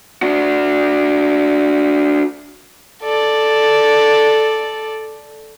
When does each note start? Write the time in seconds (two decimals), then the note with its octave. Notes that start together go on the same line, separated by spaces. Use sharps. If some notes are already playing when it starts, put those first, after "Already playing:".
0.22 D4 F#4
3.02 A4 D5